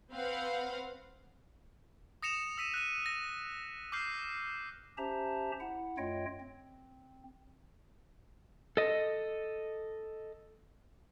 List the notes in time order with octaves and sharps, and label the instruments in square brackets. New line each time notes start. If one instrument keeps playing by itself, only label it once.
[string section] C4 B4 F5 F#5
[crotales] D#6 A#6 C#7 E7 F7
E6 B6 D#7 E7
F#6 D#7
A#6
D6 E6 F6 G6 C7
[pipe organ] C#4 G4 C5 E5 A5 A#5
E4 F#5
F#2 A3 F4 C#5 D#5 G5
C4
[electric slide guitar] A4 D#5